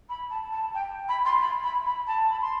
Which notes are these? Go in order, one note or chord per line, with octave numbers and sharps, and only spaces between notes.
B5
A5
A5
G5
B5
C6
B5
B5
B5
A5
B5
C6